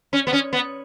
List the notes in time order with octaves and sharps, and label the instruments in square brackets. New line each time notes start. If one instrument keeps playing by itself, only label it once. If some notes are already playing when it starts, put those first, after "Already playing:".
[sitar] C#4
B3
C#4
B3